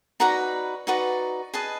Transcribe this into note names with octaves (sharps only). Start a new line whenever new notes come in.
D#4 F#4 B4 D5 A#5
D#4 F#4 B4 D5
G#4 B4 D#5 A5